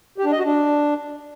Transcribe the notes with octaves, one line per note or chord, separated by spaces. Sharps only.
G4
D4
D#5
F#4
D4